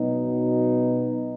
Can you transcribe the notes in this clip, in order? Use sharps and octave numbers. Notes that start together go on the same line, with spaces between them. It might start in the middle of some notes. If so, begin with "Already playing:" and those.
Already playing: B2 F#3 B3 D#4